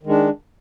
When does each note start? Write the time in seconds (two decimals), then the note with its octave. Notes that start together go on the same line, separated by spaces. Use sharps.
0.03 D#3
0.06 G#3
0.09 D4